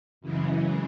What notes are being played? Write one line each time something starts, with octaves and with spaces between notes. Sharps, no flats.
F#2 C#3 E3 G#3